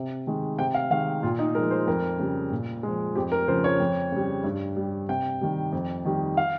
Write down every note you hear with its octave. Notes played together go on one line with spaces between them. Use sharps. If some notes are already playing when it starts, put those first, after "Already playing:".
Already playing: C3
D#3 G#3
C3 G5
F5
D#3 G#3 F5
A#2 F4
D#4
F3 G#3 A#4
C5
F2 A#4
C#3 G3
A#2
F3 G#3
F2 G4
A#4
C#3 F3 C5
C#5
F2
C#3 G3
G2
G3
C3 G5
D#3 G3
F2
D#3 G3
F5